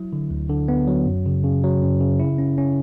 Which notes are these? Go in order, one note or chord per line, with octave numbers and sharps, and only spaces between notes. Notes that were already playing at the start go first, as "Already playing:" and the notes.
Already playing: F#3 E4
D3
D2
D3
B3
F#3
F#2
C#3
C#3
F#3
F#2
C#3
E4
C#4
C#4